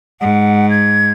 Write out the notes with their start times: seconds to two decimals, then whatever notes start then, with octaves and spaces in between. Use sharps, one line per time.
0.21 G#2 F#5
0.70 G#6